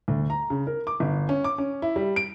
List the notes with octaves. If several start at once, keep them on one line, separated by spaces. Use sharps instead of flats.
D2
A#5
C#3
A#4
D6
G1
C#4
D6
C#4
E4
G3
D7